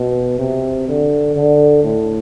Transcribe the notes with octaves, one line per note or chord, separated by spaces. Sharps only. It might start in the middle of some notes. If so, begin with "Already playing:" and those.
Already playing: B2
C3
D3
D3
A2